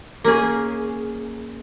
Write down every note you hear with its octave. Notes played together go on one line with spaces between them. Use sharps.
A#3 C#4 G#4